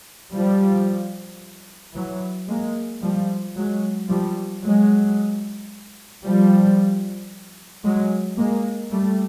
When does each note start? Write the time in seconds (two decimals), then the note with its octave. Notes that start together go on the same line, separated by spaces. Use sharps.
0.34 F3 G3
1.94 E3 F#3
2.48 G#3 A#3
3.02 F3 G3
3.56 F#3 G#3
4.09 F3 G3
4.63 F#3 G#3
6.24 F3 G3
7.84 F#3 G#3
8.38 G#3 A#3
8.91 G3 A3